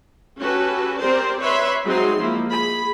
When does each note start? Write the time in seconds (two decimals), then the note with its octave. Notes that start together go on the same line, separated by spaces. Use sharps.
0.38 C#4 F#4 G4 A4 B4
0.98 C4 G4 A#4 C5 D5
1.40 B4 C#5 E5 B5 C6
1.84 F#3 G#3 C4 D#4 C6
2.18 F3 G#3 A#3 E4
2.49 G#4 B5